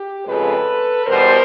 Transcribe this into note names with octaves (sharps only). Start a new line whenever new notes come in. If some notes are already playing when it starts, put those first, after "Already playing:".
Already playing: G4
F2 C#3 F3 G#3 A4 B4
E2 B2 G3 A#4 C5